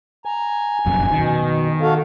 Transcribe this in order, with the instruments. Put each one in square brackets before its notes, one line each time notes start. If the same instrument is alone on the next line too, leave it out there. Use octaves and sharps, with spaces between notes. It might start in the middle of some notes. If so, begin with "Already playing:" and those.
[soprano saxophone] G#5 [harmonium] A#5
[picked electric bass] F1 A#1 F#2
[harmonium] B2 [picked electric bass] D#3
[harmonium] F#4 A4 F5